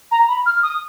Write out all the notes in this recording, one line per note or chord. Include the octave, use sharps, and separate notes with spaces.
A#5
B5
F6
D#6